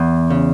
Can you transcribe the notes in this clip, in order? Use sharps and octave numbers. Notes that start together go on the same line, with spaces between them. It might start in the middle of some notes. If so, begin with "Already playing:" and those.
Already playing: E2
C#3